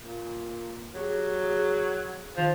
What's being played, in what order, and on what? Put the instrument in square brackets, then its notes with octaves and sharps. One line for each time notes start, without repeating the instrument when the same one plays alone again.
[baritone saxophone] A#2
[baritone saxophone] F#3 [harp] G4 G#4 C#5
[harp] G#4 F#5
F#6
[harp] D#3 C7 [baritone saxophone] F3